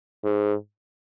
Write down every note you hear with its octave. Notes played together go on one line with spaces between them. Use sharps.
G#2